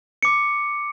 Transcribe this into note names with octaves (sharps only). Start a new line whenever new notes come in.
D6 C#7